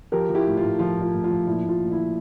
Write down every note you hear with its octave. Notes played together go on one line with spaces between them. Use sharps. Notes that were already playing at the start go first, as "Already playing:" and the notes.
F3 G4 A#4
F3
E4 G4
A2
F4
A2
F3 F4
A2 F4
A2
F4
F3
A#2 E4
A#2 F4
A#2
E4
F3